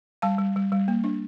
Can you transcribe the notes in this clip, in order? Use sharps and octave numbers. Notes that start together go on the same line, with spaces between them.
G3 F5 A5
G3
G3
G3
A#3
D4